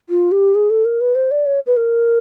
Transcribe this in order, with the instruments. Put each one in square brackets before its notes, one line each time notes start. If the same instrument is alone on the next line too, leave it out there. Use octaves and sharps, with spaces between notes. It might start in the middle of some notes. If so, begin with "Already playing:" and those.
[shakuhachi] F4
G4
G#4
A4
A#4
B4
C5
D5
C#5
B4
A#4